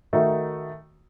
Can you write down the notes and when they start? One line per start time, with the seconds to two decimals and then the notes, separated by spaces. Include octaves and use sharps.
0.13 D#3 A3 D#4 F#4